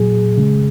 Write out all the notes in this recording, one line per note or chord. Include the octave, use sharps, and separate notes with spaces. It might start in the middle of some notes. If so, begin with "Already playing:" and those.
Already playing: A#2 F#3 G#4
C#3 G#3